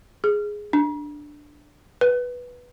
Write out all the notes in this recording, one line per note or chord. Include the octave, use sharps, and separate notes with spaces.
G#4
D4
B4